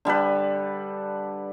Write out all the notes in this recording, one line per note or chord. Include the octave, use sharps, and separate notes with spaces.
D3 G3 A4 B4